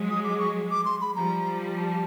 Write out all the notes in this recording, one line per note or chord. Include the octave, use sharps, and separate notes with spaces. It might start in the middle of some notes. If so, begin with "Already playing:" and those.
Already playing: F#3 G#3
D#6
D6
C#6
D6
C6
B5
F3 G3 A#5
A5